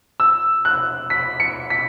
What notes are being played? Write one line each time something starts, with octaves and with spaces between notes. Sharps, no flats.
E6
F#6
B6
C#7
B6